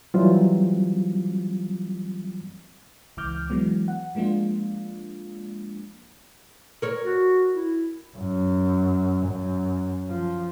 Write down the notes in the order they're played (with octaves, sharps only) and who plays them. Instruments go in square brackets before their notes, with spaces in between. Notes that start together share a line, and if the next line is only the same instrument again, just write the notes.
[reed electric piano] E3 F#3 G3 C4 F4
[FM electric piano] C#2 E3 D6 F6 G6
E3 F#3 G#3 B3
F#5
F3 G#3 A#3 D4 F4
[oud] A#4 C#5
[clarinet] F#4
E4
[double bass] F#2
F#2
F3